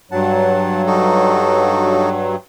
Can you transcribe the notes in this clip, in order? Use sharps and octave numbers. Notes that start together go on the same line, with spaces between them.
G2 F#3 F#5 A5
D#4 F#4 A4